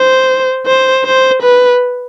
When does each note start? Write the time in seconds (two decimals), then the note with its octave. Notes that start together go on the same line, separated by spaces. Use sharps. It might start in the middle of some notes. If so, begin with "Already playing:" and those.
Already playing: C5
0.66 C5
1.05 C5
1.42 B4